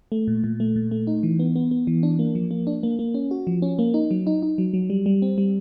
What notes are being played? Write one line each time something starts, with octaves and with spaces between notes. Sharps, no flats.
A3
A#2
A#2
A3
A#2
A3
D#4
E3
B3
B3
B3
E3
D4
A#3
F3
A#3
D4
A#3
A#3
C#4
F#4
F3
C#4
A#3
D#4
F#3
D#4
D#4
F#3
F#3
G3
G3
C4
G3